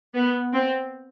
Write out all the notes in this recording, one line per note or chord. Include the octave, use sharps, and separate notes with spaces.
B3
C4